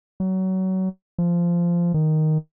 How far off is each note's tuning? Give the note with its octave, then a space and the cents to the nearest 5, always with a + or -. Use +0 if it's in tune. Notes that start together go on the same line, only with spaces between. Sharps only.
F#3 +25
F3 -15
D#3 +0